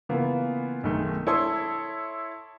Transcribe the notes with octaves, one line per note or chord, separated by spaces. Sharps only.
C#3 E3 A#3 B3 F4
B1 D#3 G#3 A3
E4 A4 C#5 C6 D#6